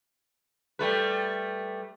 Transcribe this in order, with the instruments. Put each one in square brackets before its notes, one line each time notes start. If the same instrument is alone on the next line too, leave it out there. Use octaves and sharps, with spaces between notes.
[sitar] G3 A3 B4